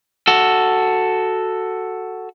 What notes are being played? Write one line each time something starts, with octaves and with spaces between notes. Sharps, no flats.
F#4 A4